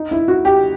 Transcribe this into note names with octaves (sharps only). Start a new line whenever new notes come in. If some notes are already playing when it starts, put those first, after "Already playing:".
Already playing: D#4
E4
F#4
G4